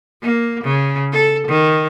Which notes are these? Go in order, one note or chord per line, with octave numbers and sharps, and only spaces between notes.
A#3
C#3
A4
D#3